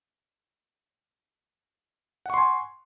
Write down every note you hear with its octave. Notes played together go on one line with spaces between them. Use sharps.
F#5 G#5 C6 C#6